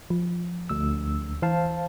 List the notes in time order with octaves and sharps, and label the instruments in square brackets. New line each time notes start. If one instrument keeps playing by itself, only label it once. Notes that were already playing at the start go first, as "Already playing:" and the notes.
[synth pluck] F3
[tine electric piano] D2 E6
[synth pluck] E3 [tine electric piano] C5 F5 A5